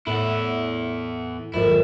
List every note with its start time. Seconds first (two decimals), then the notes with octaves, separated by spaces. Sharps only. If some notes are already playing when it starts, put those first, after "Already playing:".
0.07 E2 A2 E4 F#5
1.54 G#1 F2 E4